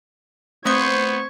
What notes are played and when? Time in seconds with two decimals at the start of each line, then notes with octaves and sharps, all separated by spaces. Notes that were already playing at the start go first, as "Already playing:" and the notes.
0.65 A3 B3 C4 C5 C#6 D#6 G#6